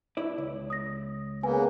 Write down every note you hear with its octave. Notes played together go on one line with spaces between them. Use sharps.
E4 D5
C#2
D#6 A#6
C#3 A#3 B3 B4 G#5